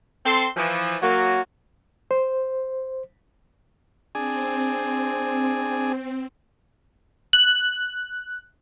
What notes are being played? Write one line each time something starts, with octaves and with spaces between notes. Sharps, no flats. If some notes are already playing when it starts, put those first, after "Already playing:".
C4 A4 C6
E3 F3
F#3 A#3 F#4
C5
C4 D4 G#4 G#5
F#6